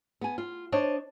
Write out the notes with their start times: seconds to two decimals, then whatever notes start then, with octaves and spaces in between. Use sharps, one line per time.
0.21 B3 G#5
0.38 F4
0.72 D4 C5 C#5 D#5